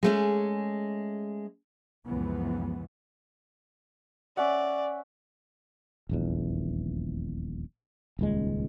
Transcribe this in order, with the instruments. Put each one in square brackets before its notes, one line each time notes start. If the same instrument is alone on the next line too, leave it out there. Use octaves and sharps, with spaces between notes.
[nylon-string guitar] G#3 A3 C#4
[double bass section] C#2 F#2 C3 E3 F3 B3
[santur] C#4 E5 F#5 [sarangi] D5
[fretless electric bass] D#1 A#1 E2
D#1 C#2 G#3